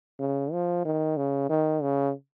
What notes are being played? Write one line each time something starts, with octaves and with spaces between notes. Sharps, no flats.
C#3
F3
D#3
C#3
D#3
C#3